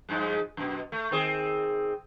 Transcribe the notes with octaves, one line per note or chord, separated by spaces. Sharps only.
G2 F3 G#3
F#2 B2
A3
D#3 C4 G#4